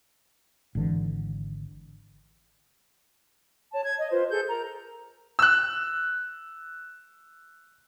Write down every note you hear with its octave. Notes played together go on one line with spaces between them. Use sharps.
G#1 D3 E3
C#5 A5
G#6
D#5
F4 B4 C5
G#4 A4 G6
A#4 A#5
E6 F#6